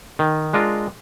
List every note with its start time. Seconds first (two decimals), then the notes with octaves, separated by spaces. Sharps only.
0.19 D#3
0.53 G#3 D4 F4 A#4